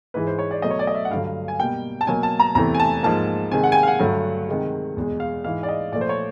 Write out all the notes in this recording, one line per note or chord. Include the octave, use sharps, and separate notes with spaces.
G#2 E3 G#3 B4
C5
C#5
D5
B2 F#3 A3 D#5
C#5
D5
D#5
E5
F#5
G2 D3 F#3 F5
G#5
B2 G3 A#3 G5
A5
B2 F#3 A#3 G#5
A5
A#5
E2 C3 E3 A3 A#5
G#5
A5
G#2 F3 A#3 A5
C3 D#3 G#3 G#5
F#5
G#5
G5
F5
F#5
G2 D3 F#3 A3
C3 D#3 G#3
E2 B2 G#3
F5
G#2 E3 G#3 F5
D5
D#5
A#2 F3 A3 D5
C5
C#5